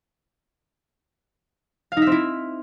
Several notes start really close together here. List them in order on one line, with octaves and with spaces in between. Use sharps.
F5 D#4 E5 C4 E4